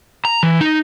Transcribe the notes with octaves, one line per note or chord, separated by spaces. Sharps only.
A#5
E3
D#4